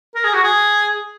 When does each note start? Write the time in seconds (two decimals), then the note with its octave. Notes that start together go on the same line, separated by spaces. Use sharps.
0.15 A#4
0.24 G#4
0.34 F#4
0.43 G#4